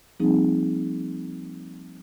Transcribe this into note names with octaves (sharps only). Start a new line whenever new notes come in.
F3 G3 A#3 C4 D#4 G#4